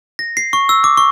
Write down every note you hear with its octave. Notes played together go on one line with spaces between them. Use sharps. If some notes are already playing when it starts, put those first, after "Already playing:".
A#6
C7
C#6
E6
D6
C#6